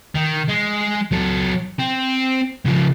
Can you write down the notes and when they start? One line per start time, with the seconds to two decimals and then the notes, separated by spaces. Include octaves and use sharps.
0.15 D#3
0.49 G#3
1.11 F#3 A4
1.79 C4
2.65 C#3 F3